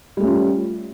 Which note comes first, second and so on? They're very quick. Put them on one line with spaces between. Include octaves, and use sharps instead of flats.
G3 A3 C#4 F4